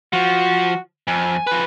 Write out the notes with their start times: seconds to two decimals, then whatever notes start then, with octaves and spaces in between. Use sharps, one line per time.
0.13 F3 F#4
1.07 F2 G#5
1.47 F3 B4